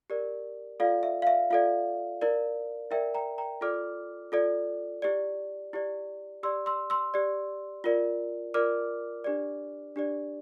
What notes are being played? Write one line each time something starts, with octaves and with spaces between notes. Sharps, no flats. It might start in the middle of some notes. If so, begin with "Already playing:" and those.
G4 A#4 D5
F4 A4 D5 F5
E5
F5
E5
F4 A4 D5 F5
E4 A#4 D5
E4 A#4 D5 E5 G5
G5 A#5
G5 A#5
F4 A4 D5 D6 F6
F4 A4 D5
E4 G4 D5
E4 G4 D5
G4 D5 C6 E6
C6 E6
C6 E6
G4 D5
F4 A#4 D5
F4 A#4 D5 D6 F6
D4 G4 D5
D4 G4 D5